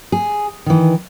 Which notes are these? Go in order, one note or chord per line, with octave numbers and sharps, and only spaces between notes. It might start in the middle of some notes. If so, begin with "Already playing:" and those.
G#4
D#3 E3